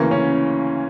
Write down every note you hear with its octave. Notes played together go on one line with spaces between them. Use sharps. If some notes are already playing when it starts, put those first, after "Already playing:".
Already playing: D2 C#3 E3 A#3
C#4